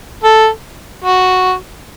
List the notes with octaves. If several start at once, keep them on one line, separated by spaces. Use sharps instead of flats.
A4
F#4